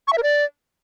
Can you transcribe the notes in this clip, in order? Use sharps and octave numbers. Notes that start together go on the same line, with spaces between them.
C#6
E5
A#4
D5